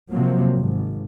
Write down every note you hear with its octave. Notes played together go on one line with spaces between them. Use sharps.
C3 F3 F#3 A#3
G#1